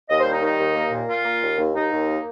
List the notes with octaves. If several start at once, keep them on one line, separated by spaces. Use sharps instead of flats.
D#2 D#5
C5
G3
D#4
D#3 D#4
D#2
A#3
A#2
A#2 F4
A#3
D#2
D#2
D#2 D#4
D#2
A#3